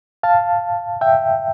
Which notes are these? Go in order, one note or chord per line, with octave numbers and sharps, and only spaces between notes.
F5 A5
E5 G5